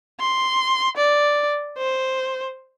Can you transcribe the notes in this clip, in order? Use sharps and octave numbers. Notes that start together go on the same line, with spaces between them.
C6
D5
C5